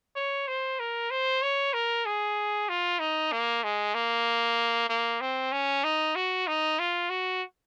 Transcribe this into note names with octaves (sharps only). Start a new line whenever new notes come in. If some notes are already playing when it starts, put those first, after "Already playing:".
C#5
C5
A#4
C5
C#5
A#4
G#4
F4
D#4
A#3
G#3
A#3
A#3
C4
C#4
D#4
F#4
D#4
F4
F#4